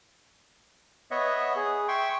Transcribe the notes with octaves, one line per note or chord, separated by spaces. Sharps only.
B3 C#5 D#5 E5 F#5
G#4
E5 G5 C6 C#6